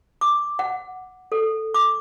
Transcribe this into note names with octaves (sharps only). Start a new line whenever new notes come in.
D6
F#5
A4
D6